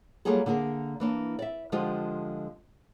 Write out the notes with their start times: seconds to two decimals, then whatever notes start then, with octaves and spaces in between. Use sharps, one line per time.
0.25 F#3 G3 A#3 F4 G#4 A4
0.46 D3 A#3 G#4 A#4
1.00 E3 A#3 D4
1.39 D5 E5
1.72 D3 F3 G#3 F4 G4